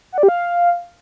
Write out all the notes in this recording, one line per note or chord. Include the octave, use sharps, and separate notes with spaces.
F#5
D5
G4
F5